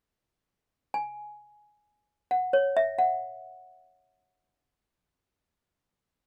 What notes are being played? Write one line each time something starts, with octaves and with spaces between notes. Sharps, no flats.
G#5
F#5
C#5
E5
F#5